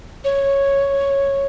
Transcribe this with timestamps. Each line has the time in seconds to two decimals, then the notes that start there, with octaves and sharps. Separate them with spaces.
0.24 C#5